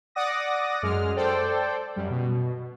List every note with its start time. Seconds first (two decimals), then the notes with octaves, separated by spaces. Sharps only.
0.15 D5 F#5 D6 D#6 A#6
0.83 F#2 G#3 F6
1.16 A4 C5 D5 G5
1.96 F#2 G3
2.10 B2